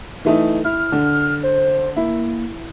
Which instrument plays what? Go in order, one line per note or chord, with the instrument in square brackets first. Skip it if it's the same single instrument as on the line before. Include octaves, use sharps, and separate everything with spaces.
[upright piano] E3 A3 D#4
[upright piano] E4 [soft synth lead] F6
[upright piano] D3
[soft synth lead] C5
[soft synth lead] A#3 [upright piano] E4